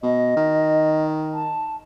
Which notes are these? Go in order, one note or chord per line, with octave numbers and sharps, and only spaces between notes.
B2 D#5
D#3
A5